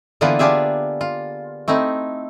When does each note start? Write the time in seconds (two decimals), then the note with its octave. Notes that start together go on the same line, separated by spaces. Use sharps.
0.21 D3 E3 A#3 B3 F4 B4
0.39 D4 F4 G4 G#4 E5
1.01 F4
1.68 A3 C4 D#4 E4